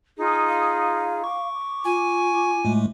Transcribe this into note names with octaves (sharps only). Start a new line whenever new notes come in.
D#4 F4 G#4
F5
C#6 D6
F4 G#5
A2 G#3 A3